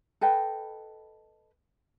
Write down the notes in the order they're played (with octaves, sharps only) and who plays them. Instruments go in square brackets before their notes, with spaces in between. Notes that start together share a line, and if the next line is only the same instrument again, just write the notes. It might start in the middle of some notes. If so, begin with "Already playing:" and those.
[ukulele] A4 B4 D#5 G5